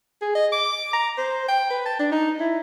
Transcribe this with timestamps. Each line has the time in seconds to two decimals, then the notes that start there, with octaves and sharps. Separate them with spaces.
0.22 G#4
0.35 D#5
0.52 D6
0.93 A#5
1.18 C5
1.48 G5
1.70 B4
1.86 A5
1.99 D4
2.12 D#4
2.40 E4